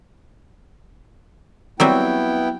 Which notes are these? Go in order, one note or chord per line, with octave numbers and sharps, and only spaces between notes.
F#3 G3 B3 C4 E4 G5